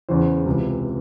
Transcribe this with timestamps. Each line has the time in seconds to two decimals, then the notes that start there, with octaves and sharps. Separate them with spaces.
0.09 E2 C#3 E3 C5
0.46 C#2 C3 E3